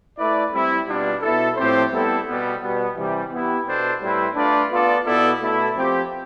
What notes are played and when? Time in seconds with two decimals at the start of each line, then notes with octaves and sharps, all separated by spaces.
0.17 A3 E4 B4 D5
0.52 G3 C4 E4
0.87 B2 G3 B3 D4 F4
1.22 B2 B3 E4 A4
1.57 A2 F3 C4 G4 C5
1.91 G3 B3 E4 A4
2.26 B2 G3 B3
2.61 B2 G3 B3
2.96 C3 E3 G3
3.31 E3 B3 E4 G4
3.66 B2 B3 D4 A4 C5
4.00 A2 G3 C4 E4 B4
4.35 A3 D4 F4 B4 D5
4.70 B3 F4 A4 D5
5.05 B2 B3 E4 A4 D5
5.40 B2 A3 E4 A4
5.75 F3 C4 G4